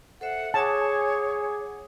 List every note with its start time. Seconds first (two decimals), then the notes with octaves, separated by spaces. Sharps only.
0.21 A4 C5 E5 F#5
0.54 G#4 C#5 F#5 G#5 A5 D6